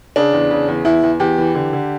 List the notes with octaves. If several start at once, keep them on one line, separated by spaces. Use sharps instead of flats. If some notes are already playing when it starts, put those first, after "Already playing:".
C#3 D4
E2
C#3
E2
E2 E4
E2
E2 G4
E3
D3
D3